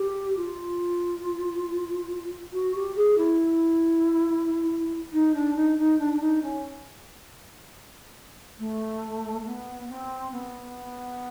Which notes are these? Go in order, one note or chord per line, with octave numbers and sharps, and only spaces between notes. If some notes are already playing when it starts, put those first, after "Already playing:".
Already playing: G4
F4
F#4
G4
G#4
E4
D#4
D4
D#4
D#4
D4
D4
D#4
C#4
A3
B3
C4
B3